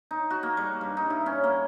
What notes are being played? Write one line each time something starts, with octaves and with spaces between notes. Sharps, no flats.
D#4
F#4
A#3
G3
G2
D#4
E4
C#4
A#3